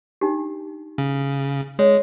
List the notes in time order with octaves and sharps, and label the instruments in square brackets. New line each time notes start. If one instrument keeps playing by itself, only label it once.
[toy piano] D4 D#4 G4
[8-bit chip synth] C#3
[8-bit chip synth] G#3 [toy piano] C#5